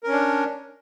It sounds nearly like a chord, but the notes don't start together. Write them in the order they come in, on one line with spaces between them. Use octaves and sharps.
A#4 C#4 D4